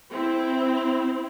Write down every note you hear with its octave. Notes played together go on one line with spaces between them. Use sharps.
C4 E4